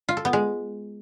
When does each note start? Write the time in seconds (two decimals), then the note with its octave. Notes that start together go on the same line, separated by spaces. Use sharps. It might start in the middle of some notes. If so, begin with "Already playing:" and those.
0.09 F4
0.17 A4
0.25 B3
0.33 G#3